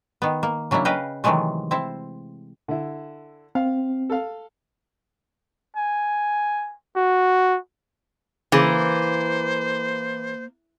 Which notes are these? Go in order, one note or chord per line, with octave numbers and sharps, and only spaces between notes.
D#3 B3
A#3
C#3 F#3 A#3 D4 E4
C#3 B4 D#5 F5 G5
C3 D#3 E3 F#3 G#3 A3
C4 E4 C5
D3 E4
C4 F5
A4 F5
G#5
F#4
C#3 E3 A#3 G#4 C5